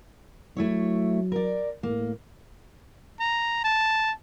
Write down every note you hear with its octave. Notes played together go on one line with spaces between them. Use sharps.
F#3 A3 E4 C#5
A#4 D5
A2 A#3
A#5
A5